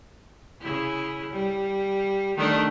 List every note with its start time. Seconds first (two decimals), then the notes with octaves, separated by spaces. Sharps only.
0.61 C#3 E4
1.33 G3
2.37 D#3 A3 D4